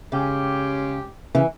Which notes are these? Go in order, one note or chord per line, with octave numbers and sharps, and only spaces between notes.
C#3 G#3 C#4 G4
C#3 E3